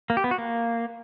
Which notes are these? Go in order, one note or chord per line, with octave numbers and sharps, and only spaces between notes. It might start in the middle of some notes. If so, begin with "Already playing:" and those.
A#3
G4
B3
F#4
A#3